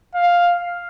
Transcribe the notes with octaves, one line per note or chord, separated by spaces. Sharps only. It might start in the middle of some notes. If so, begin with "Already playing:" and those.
F5